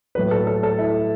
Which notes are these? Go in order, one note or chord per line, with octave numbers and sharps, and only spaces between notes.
A2 F#3 A3 B4
A4
A4
A4
E4